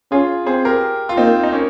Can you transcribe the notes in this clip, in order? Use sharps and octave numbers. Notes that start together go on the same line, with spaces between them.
C#4 F4 G#4
C4 G#4 C5
G4 A#4
F4
A#3 C4 D#4
D#4
A#3 C#4